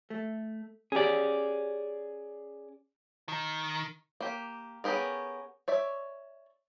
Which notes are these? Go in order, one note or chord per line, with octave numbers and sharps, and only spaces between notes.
A3
C#4 G4 G#4 D5
D#3
A#3 G4
B3 C#4 G4 G#4 A#4
C#5 D5 E5